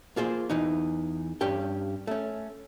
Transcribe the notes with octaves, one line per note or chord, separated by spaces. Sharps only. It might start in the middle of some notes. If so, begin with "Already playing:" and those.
A#3 F4 G#4 C5
E2 E3 D#4
G2 C#4 G4 G5
A3 C#4